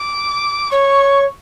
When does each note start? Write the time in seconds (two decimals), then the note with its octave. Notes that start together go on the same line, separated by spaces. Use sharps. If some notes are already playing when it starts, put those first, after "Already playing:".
Already playing: D6
0.72 C#5 C#6